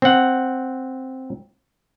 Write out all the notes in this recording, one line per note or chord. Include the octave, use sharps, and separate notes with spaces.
C4 F#5